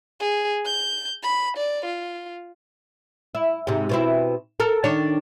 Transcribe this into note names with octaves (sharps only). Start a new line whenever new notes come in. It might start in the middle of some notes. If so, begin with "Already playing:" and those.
G#4
G6
B5
D5
F4
E4
G#2 C3
B2 C4 E4
A4 A#4
D#3 D4 C#5